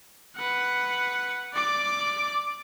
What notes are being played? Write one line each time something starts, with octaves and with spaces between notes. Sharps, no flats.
B4 F#5
D5 D6